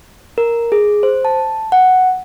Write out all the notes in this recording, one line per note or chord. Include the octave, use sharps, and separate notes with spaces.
A#4
G#4
C5
A5
F#5